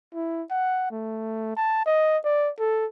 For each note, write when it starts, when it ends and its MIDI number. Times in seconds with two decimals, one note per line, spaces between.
0.14 0.43 64
0.50 0.88 78
0.91 1.55 57
1.56 1.84 81
1.85 2.18 75
2.24 2.50 74
2.59 2.86 69